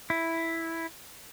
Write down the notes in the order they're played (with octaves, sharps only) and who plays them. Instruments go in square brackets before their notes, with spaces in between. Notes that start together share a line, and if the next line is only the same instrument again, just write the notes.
[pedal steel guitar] E4